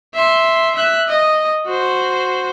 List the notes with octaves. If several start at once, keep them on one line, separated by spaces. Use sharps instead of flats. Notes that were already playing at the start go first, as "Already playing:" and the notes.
E5 C6
E5 F#6
D#5
F#4 C5